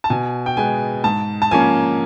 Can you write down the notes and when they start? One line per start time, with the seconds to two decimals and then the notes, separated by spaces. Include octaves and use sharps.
0.04 A5
0.10 B2 G#5
0.46 G5
0.57 G#3 B3 G#5
1.04 G#2 A5
1.42 A5
1.51 F3 A#3 C#4 G#5